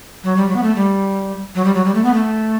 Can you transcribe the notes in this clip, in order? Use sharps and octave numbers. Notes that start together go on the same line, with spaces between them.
F#3
G3
F#3
B3
A3
G3
F#3
G3
F#3
G3
A3
B3
A3